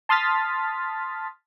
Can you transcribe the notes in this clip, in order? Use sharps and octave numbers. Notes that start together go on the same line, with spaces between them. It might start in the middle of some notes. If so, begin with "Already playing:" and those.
A5 C6 D#6 F6 A6 B6